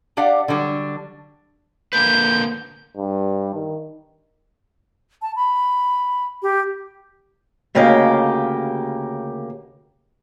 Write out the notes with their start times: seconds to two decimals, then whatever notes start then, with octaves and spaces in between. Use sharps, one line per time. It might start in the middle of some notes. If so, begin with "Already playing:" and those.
0.17 D4 G4 D5 F5 F#5
0.48 D3 F#3 G3 D4
1.93 D3 A#3 B4 G6
2.97 G2
3.55 D#3
5.22 A5
5.36 B5
6.42 G4
7.75 D2 C#3 A#3 G4 A#4 D#5